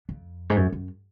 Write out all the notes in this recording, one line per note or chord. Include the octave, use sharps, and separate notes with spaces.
F2
G#2
F#2
F#2